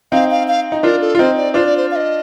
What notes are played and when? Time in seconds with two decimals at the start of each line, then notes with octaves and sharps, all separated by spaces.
0.12 C4 D#4 F5
0.31 F5
0.48 F5
0.72 D#4
0.83 D4 F4 A#4
1.01 A4
1.15 F4
1.19 C4 D#4 C5
1.37 D5
1.54 D4 F4 C5
1.66 D5
1.77 C5
1.91 F5
1.96 D#5